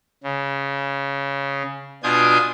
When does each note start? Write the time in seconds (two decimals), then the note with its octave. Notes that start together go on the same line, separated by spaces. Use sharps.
0.23 C#3
2.03 B2 D4 F4 G#5 D#6 G6